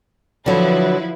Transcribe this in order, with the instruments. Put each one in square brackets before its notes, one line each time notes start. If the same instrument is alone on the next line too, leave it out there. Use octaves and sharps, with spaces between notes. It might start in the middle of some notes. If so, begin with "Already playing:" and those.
[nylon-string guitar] D3 F#3 [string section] F3 E4 B4